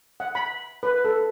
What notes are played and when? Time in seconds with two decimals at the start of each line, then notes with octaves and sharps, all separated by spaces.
0.20 F#5
0.35 B5
0.83 B4
1.05 A4